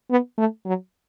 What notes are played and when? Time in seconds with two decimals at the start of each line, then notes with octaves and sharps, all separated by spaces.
0.10 B3
0.38 A3
0.66 F#3